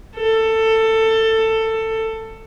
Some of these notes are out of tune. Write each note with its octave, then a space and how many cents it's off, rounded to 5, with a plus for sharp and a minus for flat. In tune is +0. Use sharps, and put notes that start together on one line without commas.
A4 +15